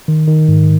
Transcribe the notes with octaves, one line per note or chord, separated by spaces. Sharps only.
D#3
D#3
G#2